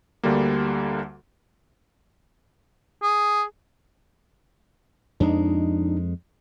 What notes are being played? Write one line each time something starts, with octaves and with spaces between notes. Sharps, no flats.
D2 D3 G3 A#3
G#4
F2 G#3 D4 D#4